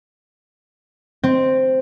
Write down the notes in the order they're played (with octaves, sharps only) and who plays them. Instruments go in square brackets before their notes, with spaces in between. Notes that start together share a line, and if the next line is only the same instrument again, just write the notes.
[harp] C4